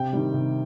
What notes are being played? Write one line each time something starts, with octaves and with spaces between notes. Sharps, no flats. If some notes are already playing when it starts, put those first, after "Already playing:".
Already playing: C3 G5
D#3 G3
C3